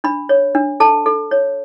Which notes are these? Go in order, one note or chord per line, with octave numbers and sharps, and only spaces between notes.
D4 B5
C#5
D4
A4 A5
A4
C#5